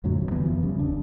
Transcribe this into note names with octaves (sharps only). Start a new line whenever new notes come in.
F2 A2 D3 F#3
F#1 D#2 B2
D3 E3 G3 B3
F#2 E3 F3
G1 C#3 G3 C#4
E1 B1 C#3 D4